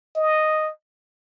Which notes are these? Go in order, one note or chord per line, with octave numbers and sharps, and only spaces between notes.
D#5